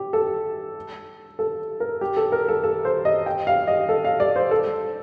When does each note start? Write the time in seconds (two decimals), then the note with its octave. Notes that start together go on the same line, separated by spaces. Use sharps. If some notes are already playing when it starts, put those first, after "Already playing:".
Already playing: G4
0.13 A4
1.39 A4
1.80 A#4
2.01 G4
2.17 A4
2.32 A#4
2.48 A4
2.64 A4
2.85 C5
3.05 D#5
3.26 G5
3.47 F5
3.67 D#5
3.89 A4
4.05 F5
4.20 D5
4.36 C5
4.51 A4